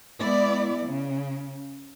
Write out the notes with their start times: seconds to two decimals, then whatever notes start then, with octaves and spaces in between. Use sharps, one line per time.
0.20 G#3 B3 E4 D5
0.84 C#3